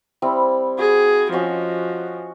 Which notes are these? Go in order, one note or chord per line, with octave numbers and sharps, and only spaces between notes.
G3 C4 E4
F#4 G#4
F3 C#4 F#4 D#5